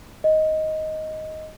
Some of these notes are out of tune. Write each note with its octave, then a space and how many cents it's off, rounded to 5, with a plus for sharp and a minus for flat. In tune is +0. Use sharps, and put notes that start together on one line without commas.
D#5 +5